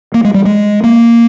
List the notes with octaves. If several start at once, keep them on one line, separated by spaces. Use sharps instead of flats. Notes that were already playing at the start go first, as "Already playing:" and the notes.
A#3
G#3
G3
G#3
A#3